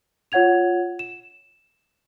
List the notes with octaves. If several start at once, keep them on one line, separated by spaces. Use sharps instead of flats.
F4 C#5 F#5 G#6 F7
E7